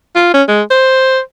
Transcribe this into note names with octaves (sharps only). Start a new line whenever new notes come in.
F4
C#4
G#3
C5